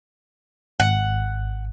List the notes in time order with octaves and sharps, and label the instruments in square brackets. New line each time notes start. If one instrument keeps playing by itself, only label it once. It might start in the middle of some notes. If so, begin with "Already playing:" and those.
[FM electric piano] G#1 [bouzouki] F#5